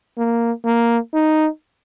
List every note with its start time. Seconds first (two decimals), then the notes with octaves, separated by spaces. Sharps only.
0.18 A#3
0.65 A#3
1.14 D#4